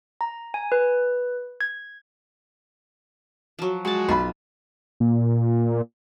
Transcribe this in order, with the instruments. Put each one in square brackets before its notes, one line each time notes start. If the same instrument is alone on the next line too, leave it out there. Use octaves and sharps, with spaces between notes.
[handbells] A#5
G#5
B4
G#6
[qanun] F3 F#3
[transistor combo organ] G#3 F#4 [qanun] C5 A5
[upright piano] B1 B5 [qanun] F4
[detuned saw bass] A#2